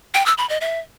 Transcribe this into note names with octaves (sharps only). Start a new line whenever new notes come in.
G5
E6
B5
D#5
E5